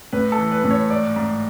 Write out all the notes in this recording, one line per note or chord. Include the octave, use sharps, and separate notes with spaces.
A2 B4
A4
E3
B4
A2
C#5
G#2 D5
G#2